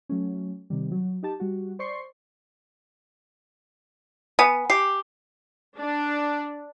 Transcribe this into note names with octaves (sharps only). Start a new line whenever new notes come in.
F#3 A3 C#4
C3 D#3 G3
F#3
D#4 G4 A5
G3 F#4
C5 D5 C6 C#6 C7
B3 G#5
G4 C7
D4